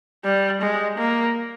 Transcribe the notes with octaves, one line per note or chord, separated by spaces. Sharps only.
G3
G#3
A#3